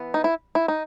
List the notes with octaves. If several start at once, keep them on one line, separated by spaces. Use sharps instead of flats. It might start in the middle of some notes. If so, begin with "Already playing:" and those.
Already playing: E3 B3
D#4
E4
E4
D#4